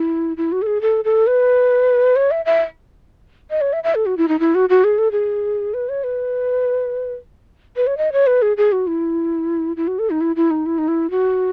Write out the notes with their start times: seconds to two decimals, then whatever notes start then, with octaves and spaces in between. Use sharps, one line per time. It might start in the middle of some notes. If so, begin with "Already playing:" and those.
Already playing: E4
0.37 E4
0.52 F#4
0.62 A4
0.67 G#4
0.81 A4
1.05 A4
1.27 B4
2.16 C#5
2.31 E5
2.46 E5
3.50 D#5
3.61 C#5
3.73 E5
3.84 E5
3.95 A4
4.06 F#4
4.17 E4
4.28 D#4
4.40 E4
4.55 F#4
4.69 F#4
4.84 G#4
4.98 A4
5.12 G#4
5.74 B4
5.89 C#5
6.04 B4
7.76 B4
7.87 C#5
7.98 D#5
8.12 C#5
8.27 B4
8.42 G#4
8.57 G#4
8.72 F#4
8.87 E4
9.77 E4
9.88 F#4
9.99 A4
10.10 D#4
10.21 E4
10.36 E4
10.51 D#4
10.66 E4
10.78 D#4
10.88 E4
11.11 F#4